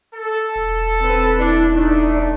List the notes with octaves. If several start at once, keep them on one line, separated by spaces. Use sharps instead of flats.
A4
E1
C4 B4
D4 E4
A3 D4 D#4 D5